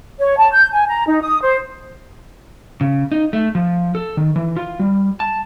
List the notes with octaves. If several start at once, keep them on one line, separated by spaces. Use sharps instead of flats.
C#5
A5
G6
G#5
A#5
D#4
D#6
C5
C#3
D#4
A3
F3
A4
D#3
E3
F4
G3
A5